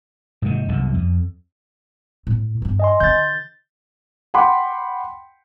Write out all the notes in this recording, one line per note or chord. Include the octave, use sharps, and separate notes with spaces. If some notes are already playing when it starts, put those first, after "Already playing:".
G#2 C3 D#3
C2 F#2 B2
F2
A2
G2 D4
D#5 G#5 C6
D3 D4 G6 A6
F#5 G5 B5 C6 D6